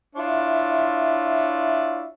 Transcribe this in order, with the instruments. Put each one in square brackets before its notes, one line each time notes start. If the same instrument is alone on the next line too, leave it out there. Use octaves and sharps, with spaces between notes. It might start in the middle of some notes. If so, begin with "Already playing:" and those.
[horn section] D4 E4 F4 C#5 E5